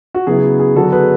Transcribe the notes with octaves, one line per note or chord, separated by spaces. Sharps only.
F#4
C#3 F#3 B3 E4 G#4
G#4
D3 F#3 B3 D4 F#4 A4
G#4 B4